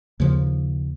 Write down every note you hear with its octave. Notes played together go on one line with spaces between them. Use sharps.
D#2 C#3 F3